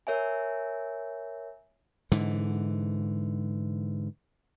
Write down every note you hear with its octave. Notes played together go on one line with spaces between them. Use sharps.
A#4 C#5 E5 G#5
G#2 D3 E3